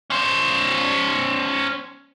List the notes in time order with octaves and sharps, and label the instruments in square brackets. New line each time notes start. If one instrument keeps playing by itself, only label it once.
[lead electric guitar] C#4 C5